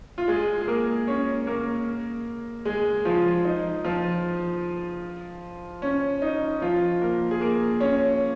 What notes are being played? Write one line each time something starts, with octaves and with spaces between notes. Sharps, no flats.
F4
G#3 G#4
G#4
A#3 A#4
C#4 C#5
A#3 A#4
G#3 G#4
F3 F4
D#4
F3 F4
C#4
D#4
F3 F4
A#3 A#4
G#4
A#3 A#4
C#4 C#5